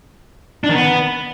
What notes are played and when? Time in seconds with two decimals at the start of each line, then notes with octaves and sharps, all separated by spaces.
0.64 D4
0.69 D#3
0.75 B3